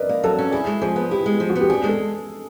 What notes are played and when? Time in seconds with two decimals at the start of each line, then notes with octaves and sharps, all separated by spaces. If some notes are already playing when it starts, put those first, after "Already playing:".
Already playing: A#4 B4 D5 D#5
0.09 A#3
0.23 F#3 A4
0.39 C#4
0.52 E4 G#4
0.67 G#3
0.81 F3 G#4
0.96 B3
1.11 E4 G4
1.26 G#3
1.40 F3
1.50 F#4
1.56 B3
1.61 G4
1.69 D4 G#4
1.84 G#3
1.89 A4